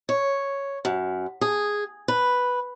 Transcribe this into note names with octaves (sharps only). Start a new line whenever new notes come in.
C#5
F#2
G#4
B4